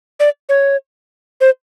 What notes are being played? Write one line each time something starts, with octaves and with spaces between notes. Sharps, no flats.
D5
C#5
C5